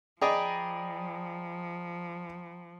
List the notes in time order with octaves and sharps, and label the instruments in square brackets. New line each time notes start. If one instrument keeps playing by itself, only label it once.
[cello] F3 [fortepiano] G#4 D5 D#5 [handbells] G5 A#5 B5